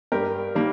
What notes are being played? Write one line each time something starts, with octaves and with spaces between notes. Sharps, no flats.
G2 G4 A#4
D#3 G3 A#3